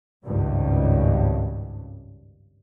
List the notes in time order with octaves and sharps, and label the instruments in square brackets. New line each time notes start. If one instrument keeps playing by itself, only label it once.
[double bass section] G#1 C#2 G2 C#3